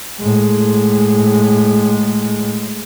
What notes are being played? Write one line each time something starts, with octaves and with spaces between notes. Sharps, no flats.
A2 G#3